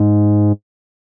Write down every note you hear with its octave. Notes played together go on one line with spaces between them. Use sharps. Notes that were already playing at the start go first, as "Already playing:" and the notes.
Already playing: G#2